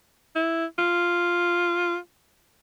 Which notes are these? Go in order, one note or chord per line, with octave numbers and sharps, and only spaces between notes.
E4
F4